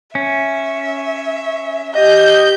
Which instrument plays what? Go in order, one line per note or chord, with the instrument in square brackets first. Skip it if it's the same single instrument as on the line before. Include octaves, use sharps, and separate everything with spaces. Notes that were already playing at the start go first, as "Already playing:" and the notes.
[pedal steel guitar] C#4 [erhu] E5
[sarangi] G4 [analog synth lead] D#5 [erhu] G6